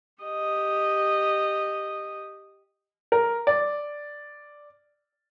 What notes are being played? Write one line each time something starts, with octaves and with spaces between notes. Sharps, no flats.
G4 D#5
A#4
D5